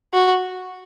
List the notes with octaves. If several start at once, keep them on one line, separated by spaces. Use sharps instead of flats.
F#4